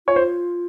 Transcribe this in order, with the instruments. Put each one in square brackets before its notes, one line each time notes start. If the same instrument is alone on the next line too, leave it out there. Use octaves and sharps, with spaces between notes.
[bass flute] F4 [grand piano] C#5
[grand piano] C5